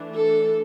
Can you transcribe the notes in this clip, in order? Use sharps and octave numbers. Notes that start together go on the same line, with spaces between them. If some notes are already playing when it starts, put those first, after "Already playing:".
Already playing: E3 A3 D4
A4